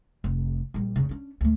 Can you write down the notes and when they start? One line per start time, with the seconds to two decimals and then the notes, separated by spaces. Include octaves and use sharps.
0.24 F1
0.74 A#1 G3
0.96 F1 C#3
1.09 C#4 D4
1.41 D2 A3